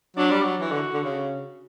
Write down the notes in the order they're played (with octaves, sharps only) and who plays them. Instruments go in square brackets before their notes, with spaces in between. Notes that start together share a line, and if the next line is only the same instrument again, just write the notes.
[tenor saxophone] F#3 [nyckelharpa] D4
[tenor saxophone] G3
F#3
[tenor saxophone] E3 [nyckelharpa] F#4
[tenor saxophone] D3
D3
C#3